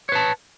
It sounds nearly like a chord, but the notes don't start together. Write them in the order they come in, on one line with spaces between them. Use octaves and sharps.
C#5 B4 A5